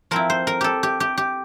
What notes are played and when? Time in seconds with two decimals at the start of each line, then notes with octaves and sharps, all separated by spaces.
0.11 F3 C4 E4 A#4
0.30 C5
0.47 A#4
0.61 G4 A4
0.83 G4
1.00 G4
1.17 G4